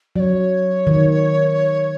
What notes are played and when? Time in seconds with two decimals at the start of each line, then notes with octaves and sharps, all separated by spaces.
0.16 F#3 D5
0.20 C#5
0.87 D#3